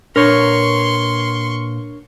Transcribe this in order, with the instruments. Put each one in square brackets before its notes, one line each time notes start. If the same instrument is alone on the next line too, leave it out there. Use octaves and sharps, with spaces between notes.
[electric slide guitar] A#2 B4 A#5 [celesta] D4 [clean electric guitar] A#4 C#5 [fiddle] C6 C#6